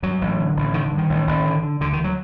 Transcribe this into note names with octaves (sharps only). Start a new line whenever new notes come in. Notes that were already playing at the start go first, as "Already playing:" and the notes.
G2 F#3
A1
D3
A1
D3 D#3
D3
G2
D#3
A1
A1
D3
D3
D2 D3
D#3
D2
F#3